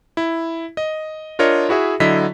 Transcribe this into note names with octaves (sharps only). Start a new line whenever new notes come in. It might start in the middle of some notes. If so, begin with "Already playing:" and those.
E4
D#5
D4 F4 A#4 C#5 D#5
E4 F#4 G#4 E5
D3 F#3 E4 D#5 B6